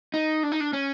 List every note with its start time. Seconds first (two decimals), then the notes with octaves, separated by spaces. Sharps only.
0.14 D#4
0.43 D4
0.52 D#4
0.60 D4
0.73 C#4